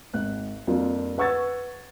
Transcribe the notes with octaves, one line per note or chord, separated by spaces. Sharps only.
G#1 F#6
F2 G3 A#3 D4 F4
B4 F#5 C#6 E6 G#6 A6